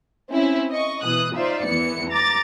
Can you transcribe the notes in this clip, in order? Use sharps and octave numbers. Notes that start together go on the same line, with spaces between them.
C4 C#4 E4
D#5 C#6
B2 E3 D#6 F#6
D#4 F4 C5 D5 E5
E2 E3 B3 C#7
A#5 D6 A6